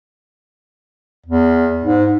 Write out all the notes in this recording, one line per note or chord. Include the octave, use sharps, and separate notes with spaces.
E2
G#2